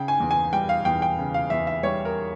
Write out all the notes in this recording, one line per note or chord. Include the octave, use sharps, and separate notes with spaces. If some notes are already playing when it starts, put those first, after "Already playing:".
Already playing: C#3 G5
G#5
E2
G#5
G3 G5
F5
E2 G5
G5
C#3
F5
E2 E5
E5
G3 C#5
A#4